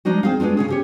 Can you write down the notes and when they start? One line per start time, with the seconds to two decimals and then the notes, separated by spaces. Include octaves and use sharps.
0.05 F3 G#3 D4 D#4 F#4
0.23 C4 G#4 F5
0.40 G#3 B3 D4 F4
0.57 C#3 C#4 G#4
0.68 C#4 G4 C#5